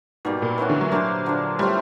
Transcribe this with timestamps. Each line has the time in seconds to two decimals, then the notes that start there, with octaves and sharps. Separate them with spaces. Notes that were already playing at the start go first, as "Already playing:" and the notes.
0.25 G#2 B2 G3 A#3
0.42 A#2
0.58 E3 A3 C#4 F#4
0.70 D3
0.81 F#3
0.92 F#3 A#3 D4 G4 C5
1.26 D3 F3 A#3 D4
1.58 A2 F3 G3 A3 C4